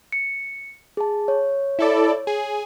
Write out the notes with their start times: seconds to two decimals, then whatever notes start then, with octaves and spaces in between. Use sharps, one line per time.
0.12 C#7
0.97 G#4 A5
1.28 C#5
1.79 E4 A4 D5
2.27 G#4